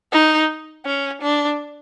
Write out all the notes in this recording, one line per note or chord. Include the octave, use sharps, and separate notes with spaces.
D#4
C#4
D4